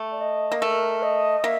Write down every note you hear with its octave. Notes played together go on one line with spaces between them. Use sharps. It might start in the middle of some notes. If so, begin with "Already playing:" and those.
Already playing: A3
D5
D#5
A#3
A3 A#4
D#5
A#3 E5